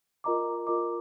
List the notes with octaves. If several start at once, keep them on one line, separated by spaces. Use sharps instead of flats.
F4 A#4 D#5 A#5 D6
F4 A#4 D#5 A#5 D6